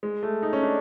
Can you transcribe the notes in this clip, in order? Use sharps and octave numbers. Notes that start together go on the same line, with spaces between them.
G#3
A3
D#4
C#4
D4